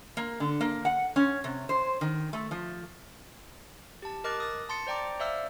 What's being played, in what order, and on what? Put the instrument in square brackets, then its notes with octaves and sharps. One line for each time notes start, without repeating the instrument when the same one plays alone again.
[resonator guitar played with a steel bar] A#3
D3
A#3
F#5
C#4
C3
C5
D#3
A3
F3
[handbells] G4 A5
A#4 D#5 D6 F6 F#6 A6
D#6 A6
A5 C6 A6 C#7
C5 D5 G5 A#5 D6
C5 D5 E5 F5 E6 F6